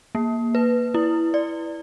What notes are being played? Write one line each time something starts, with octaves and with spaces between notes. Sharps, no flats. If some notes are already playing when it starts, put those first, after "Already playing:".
A#3
B4
E4
D5